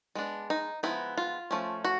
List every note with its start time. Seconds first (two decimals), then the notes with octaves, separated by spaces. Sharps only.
0.15 G#3 B3 D4
0.50 D#4
0.83 F3 G#3 B3 D#4 E4
1.17 F4
1.51 F3 A3 C#4
1.84 F#4